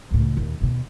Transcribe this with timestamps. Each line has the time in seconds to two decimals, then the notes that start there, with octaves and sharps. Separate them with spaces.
0.11 C#2 A2
0.37 D#2 A#2
0.61 D#2 B2